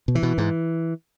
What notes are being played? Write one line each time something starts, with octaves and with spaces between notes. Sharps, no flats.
B2
E3
B2
G#2